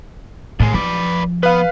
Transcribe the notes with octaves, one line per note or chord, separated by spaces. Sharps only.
D#2 A2 G#3
F3 B4 D5
B3 B4 F5